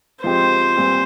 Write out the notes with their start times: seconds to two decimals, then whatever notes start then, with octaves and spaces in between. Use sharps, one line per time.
0.24 F3 G#3 C4 G4 C5
0.77 A#2 G3 C4